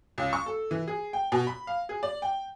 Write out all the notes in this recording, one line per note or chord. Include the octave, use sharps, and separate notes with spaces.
C#2
C#6
A4
E3
G#4
G5
B2
B5
F5
G#4
D5
G5